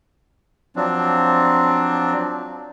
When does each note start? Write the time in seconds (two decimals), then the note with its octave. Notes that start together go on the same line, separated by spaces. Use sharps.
0.76 F3 F#3 C4 D4